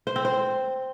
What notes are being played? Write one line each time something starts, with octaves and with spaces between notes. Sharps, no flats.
C5
C4
C5